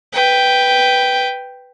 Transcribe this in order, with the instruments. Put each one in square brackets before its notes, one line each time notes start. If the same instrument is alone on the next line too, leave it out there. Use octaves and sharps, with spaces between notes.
[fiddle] B4 G5